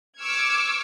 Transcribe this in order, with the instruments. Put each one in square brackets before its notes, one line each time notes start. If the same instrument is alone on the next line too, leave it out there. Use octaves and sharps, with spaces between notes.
[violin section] C#6 D6 E6 F6 G#6 C#7